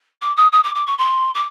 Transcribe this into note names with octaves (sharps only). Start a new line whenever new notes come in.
D6
D#6
D#6
D6
D6
C#6
C6
D6